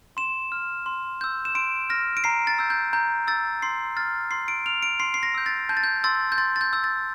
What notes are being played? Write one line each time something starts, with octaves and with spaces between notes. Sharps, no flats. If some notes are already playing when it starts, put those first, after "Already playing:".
C6 E7
F6
C6
E6 G6
E7
C6 D7
F6 A#6
D7
A#5 C7
A6
E6 G6
G6
A#5 G6
E6 G6 A6
C6 C7
F6 A6
C6 C7
D7
F6 F7
D7
C6 C7
C7
A#6
E6 G6
A6
A5 G6
A6
G6
C6 E6 A6
G6
C6 A6
A6
G6
E6 G6
A6